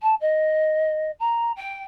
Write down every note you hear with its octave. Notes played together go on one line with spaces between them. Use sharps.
A5
D#5
A#5
G5